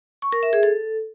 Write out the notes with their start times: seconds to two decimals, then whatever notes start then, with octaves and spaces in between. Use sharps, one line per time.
0.22 C#6
0.33 A#4
0.43 E5
0.53 G#4
0.63 A4